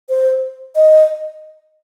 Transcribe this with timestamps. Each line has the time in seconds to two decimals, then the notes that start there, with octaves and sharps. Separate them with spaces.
0.09 C5
0.75 D#5